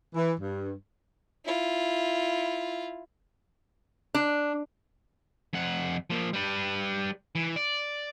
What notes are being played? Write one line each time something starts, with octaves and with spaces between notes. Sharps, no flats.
E3
G2
E4 F4
D4
F2 F#5
F3 A#3
G3 B4
E3
D5